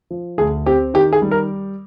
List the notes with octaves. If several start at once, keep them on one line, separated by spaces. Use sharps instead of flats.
F3
D2 G#4
C4 G4
D#3 G4
G#4
G3
A#4